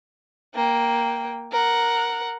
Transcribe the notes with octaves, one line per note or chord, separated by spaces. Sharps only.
A#3 G5
A#4 F#5